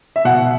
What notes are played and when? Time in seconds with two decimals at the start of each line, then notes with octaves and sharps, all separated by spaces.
0.16 E5
0.25 B2 F#5